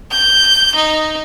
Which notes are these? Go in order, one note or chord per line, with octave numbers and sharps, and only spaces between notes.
G6
D#4